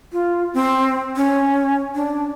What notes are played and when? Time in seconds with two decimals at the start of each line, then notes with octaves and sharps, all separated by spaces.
0.12 F4
0.54 C4
1.16 C#4
1.95 D4